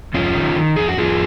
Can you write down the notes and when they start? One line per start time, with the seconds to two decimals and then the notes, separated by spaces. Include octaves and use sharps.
0.14 F2 C#4 F4
0.36 D#3
0.56 D#3
0.76 F2 G#4
0.88 F#4
0.97 F2 F4 G#4